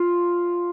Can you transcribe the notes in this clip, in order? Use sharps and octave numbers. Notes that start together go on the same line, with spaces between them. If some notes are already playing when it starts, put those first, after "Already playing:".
Already playing: F4